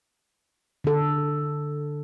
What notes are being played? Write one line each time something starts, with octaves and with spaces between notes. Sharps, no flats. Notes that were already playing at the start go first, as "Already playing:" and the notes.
D3 A4